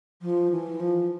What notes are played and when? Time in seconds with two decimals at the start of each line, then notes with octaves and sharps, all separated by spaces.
0.22 F3
0.51 E3
0.80 F3